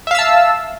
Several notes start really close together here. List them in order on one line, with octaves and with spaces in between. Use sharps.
E5 F5 E6 A5